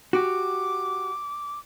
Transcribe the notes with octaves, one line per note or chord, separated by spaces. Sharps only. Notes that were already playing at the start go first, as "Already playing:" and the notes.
F#4 G4 D6